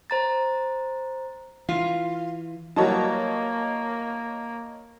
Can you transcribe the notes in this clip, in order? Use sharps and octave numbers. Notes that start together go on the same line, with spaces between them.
C5 A#5 A6
E3 F4
E3 F#3 G3 A#3 C#5 D#5 A5